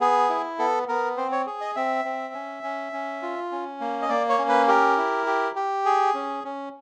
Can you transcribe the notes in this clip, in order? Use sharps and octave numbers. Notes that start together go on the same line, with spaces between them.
B3 G#4
E4
B3 A4
B3 A#4
C4 C5
C#5
G#4
D#5
C4 E5
C4
C#4
C#4
C#4
F4
C#4
A#3
D#5
A#3 D5
C#5
C#4
B4
G4 A#4
E4
G4
G4
G#4
C#4
C#4